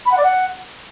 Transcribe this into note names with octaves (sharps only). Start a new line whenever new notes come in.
B5
F#5
D5
F#5